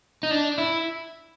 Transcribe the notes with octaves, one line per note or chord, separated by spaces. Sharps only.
D#4
D4
E4